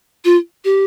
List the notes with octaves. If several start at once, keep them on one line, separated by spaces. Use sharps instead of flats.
F4
G4